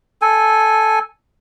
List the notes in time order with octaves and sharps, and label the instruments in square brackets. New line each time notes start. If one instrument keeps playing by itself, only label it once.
[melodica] A4 G#5